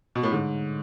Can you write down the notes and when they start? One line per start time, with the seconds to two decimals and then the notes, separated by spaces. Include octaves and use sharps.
0.15 B2
0.23 A2
0.32 G#2 D3